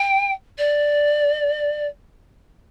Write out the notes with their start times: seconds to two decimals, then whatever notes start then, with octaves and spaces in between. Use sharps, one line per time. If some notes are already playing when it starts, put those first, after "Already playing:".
Already playing: G5
0.58 D5